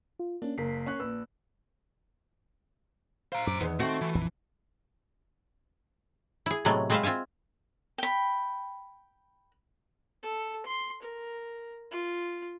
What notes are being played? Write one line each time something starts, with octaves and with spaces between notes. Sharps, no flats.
F4
A#3 C#4 D4
F#1 A#4 B6 C7
C#4 C#6 F#6
A#1 B4 E6
C5 F5 A#5
F#2 D6
E2 D#3 B3
A3 C4 F#4
E3
A#1 F2
E4 G#4
A2 C3 F#3 G#3 A3 B3
G#3 C4 B4 C5 E5 F5
C4 F4 E5 F5 G#5
G5 B5
A4
C6
A#4
F4